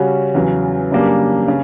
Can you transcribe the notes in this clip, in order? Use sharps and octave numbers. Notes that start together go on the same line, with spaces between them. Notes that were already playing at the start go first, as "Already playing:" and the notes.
Already playing: C#3 G3 C#4 F#4
E2 C#3 F#3
F#2 C#3 G3 A#3 D4
C#3